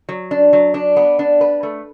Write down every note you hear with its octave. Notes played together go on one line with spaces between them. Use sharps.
F#3
D4
F#3
D4
B3
D4
B4
A3